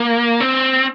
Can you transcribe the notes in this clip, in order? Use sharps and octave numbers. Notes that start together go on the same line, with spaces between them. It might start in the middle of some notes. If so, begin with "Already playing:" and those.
Already playing: A#3
C4